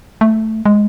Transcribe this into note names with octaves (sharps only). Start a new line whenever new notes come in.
A3
G#3